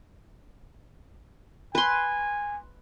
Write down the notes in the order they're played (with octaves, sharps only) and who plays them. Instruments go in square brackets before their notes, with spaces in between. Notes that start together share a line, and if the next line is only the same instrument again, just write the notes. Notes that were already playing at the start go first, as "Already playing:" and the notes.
[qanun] B4 C6 [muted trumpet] G#5